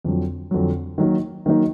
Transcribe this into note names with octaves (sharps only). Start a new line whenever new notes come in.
F2 D3 F#3
F2 D3 F#3
D#3 F#3 A#3 D#4
D#3 F#3 A#3 D#4